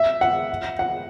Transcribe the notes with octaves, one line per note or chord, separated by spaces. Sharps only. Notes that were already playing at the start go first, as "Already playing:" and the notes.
Already playing: E5
F#5
F#5